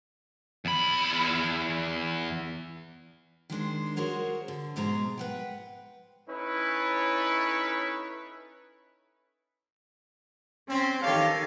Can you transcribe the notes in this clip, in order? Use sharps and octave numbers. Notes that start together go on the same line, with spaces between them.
E2 B5
D#3 G#3 D4 C5
F#4 G#4 A#4 C5 C#5 F#5
D3
G#2 B2 G#3 C5 A#5
B4 F#5 G5
C#4 D#4 E4 A4 B4 C#5
C4 C#4
D#3 G4 A4 C#5 F5